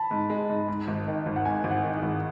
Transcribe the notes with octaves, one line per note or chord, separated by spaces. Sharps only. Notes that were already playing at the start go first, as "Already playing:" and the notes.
Already playing: A5 B5
G#2
G#3
G#2
G#2
G#1
D#3
G#1
F#5
G#2 G#5
G#1
F#5
D#3
G#4
G#1